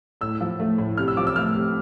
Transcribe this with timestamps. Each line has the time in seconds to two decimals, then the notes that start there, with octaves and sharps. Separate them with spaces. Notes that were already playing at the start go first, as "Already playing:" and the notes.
0.21 A2 E6
0.41 F3
0.60 A3
0.78 A2
0.97 C3 F6
1.08 E6
1.17 F3 D6
1.27 E6
1.36 A3 F6
1.55 C3